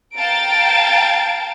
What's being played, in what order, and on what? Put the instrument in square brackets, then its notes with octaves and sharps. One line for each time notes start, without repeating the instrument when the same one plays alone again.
[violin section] F5 G5 A5 A#5 A6 D7